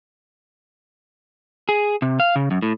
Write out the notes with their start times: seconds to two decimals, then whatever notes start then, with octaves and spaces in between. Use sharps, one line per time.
1.69 G#4
2.02 C3
2.20 F5
2.36 C#3
2.51 F#2
2.63 A2